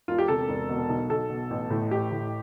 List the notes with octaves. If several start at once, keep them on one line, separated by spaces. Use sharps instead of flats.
E1 F4
G4
C3 A4
E1
B2
B1
B1 A4
B2
A1
A2
A1 G4
A2